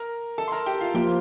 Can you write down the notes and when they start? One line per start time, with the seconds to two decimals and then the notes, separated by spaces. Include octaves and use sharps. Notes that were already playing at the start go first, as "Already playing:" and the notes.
Already playing: A#4 A#5
0.38 A4 A5
0.48 C6
0.52 A#4 A#5
0.66 G4 G5
0.81 F4 F5
0.94 F3 A#3 F4 G4 G5